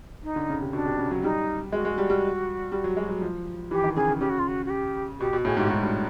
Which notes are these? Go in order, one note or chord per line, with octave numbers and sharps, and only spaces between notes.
D#4
D3
C#3
C3
B2 D4
C3
C#3
F#3
G3 D#4
G#3 F#4
G#3
G3
G3
G3
F#3
G#3
F#3
F3
E3 G4
D#3
C#3 G#4
C#3
C#3 G4
F#4
F4
F#4
F#4
G4
B2 G4
B2
A2 G#4
G#2 G4
G#2 F#4
G2